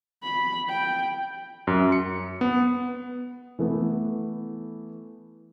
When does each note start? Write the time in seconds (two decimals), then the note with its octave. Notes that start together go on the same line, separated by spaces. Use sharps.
0.23 B5
0.69 G5
1.67 F#2
1.92 C#7
2.41 B3
3.59 E3 A3 B3